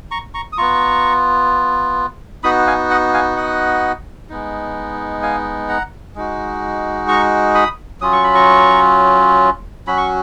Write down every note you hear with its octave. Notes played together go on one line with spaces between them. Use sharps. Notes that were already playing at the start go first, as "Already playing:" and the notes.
A#5 C#6
A#5 C#6
D#6
B3 F4 A#5 C#6
B3 D#4 F#4 B5 D#6
F5 G#5
D#5 F#5
F5 G#5
D#5 F#5
G#3 B3 D#4
F5 G#5
F#5 A#5
G#3 D#4 F#4
A#5 C#6
B5 D#6
F#3 C#4 F4 D#6
C#6
B5
A#5 C#6
F#3 C#4 F#4 B5
C#6